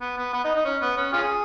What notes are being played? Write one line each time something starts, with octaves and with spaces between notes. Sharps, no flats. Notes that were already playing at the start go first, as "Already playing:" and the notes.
B3
B3
B3
D#4
D#4
C#4
B3
C#4
C#4 F4 G#4